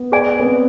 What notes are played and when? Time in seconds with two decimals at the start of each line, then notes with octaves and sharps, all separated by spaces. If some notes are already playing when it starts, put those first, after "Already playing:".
Already playing: B3
0.12 G#4 D5 G#5
0.40 B3
0.44 C4